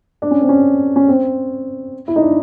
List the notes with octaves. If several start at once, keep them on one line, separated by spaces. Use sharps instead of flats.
D4
C#4
C4
C#4
C#4
C4
E4
D#4
D4